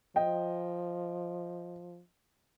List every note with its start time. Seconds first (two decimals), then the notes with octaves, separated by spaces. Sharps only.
0.16 F3 D#5 G5